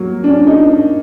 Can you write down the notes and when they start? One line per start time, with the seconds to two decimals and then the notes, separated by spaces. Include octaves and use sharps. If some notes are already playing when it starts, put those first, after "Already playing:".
Already playing: F#3 A#3
0.24 D4
0.29 C#4
0.47 D#4